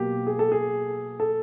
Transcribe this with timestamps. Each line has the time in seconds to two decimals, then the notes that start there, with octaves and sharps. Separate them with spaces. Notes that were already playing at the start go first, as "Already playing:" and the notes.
Already playing: B2 F#3 A#3 G4
0.27 G#4
0.39 A4
0.52 G#4
1.20 A4